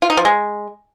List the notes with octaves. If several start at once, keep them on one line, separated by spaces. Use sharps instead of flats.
F4
D#4
F3
G#3